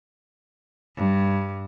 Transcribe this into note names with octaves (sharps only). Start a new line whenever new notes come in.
G2